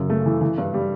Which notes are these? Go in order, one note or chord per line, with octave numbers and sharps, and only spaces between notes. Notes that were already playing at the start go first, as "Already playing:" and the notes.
Already playing: F#2 C#3
A3
E3
E3
G2
G3